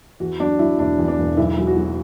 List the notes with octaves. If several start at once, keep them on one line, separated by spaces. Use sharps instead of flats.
E2 F#4
F#3 D4
F#3 E4
E1 D4
E2
D4
E1
B1 E4
F#3
F#4
F#3